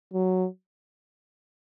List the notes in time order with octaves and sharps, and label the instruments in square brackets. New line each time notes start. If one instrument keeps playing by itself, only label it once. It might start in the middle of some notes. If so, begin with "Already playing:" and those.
[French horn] F#3